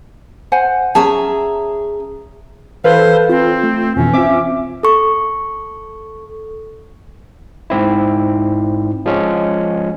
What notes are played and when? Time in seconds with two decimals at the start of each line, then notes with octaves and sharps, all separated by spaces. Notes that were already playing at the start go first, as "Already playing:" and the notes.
0.52 C5 F#5 G#5
0.95 C#4 G#4 E5 A5 A#5
2.84 E3 A4 B4 C5 F5
3.29 C4 F4
3.63 A3
3.96 F2 B2 E3 C#4
4.13 C4 F4 E5 D6
4.83 A4 C#6
7.70 G#2 C4 E4
9.06 F3 G#3 C#4